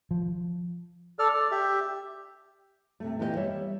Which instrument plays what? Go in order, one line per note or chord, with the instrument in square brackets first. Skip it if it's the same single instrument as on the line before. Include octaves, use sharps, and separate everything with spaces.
[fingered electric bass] F3
[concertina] A4 D5 F6
D5
G4 E5
[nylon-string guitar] C3 A3
A#2 E3 B3 G4 G#4 D#5
G3 C#5 E5